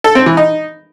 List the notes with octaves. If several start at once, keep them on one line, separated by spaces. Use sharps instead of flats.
A4
C4
E3
D#4